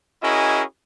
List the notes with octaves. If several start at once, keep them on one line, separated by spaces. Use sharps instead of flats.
C#4 E4 F#4 G#4 A#4 D#5